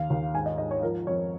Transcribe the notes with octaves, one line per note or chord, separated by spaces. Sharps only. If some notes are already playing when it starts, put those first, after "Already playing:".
Already playing: D#2 F5
D#2
G#2 G#5
D#5
G#2 D#5
C#5
F3 A#4
F2 C#5